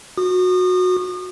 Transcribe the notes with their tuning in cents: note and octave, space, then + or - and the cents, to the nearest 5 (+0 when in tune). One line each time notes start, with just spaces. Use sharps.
F#4 -20 D#6 -40